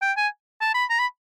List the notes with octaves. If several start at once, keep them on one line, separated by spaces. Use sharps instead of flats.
G5
G#5
A5
B5
A#5
B5